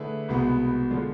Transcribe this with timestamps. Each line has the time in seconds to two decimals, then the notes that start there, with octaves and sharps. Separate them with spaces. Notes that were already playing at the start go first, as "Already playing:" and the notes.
Already playing: D3 A3 E4 G#4 B4
0.29 C2 B2 G#3 B3
0.91 D3 F3 G#3